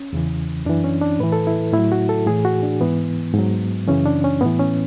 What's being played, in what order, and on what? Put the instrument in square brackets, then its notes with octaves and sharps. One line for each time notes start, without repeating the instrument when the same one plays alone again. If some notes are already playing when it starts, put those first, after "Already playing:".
Already playing: [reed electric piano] C#4
E2 C#3 E3
F#2 E3 D4
C#4
D4
A2 E3 B4
A4
E4
A2 F#3 E4
F#4
A4
A2 E3 G#4
F#4
D4
G#2 E3 B3
G#2 F#3
F#2 C#3 E3 C#4
D4
C#4
A2 E3 B3
C#4